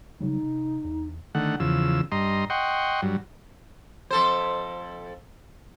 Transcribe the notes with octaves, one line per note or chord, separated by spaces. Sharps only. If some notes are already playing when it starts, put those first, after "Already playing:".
C#3 F#3 G3 D#4
C3
E2
D3 D#3 A3 F#5
E2 C#3 F3 E6
G2 D#5 A#5 C6
D#5 F#5 G5 C6 C#6
G2 F#3
F2 A4 C5